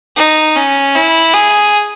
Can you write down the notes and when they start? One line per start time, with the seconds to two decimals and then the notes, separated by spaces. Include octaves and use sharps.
0.17 D#4
0.56 C#4
0.95 E4
1.33 G#4